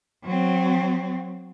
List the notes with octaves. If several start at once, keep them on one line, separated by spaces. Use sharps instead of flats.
F#3 C4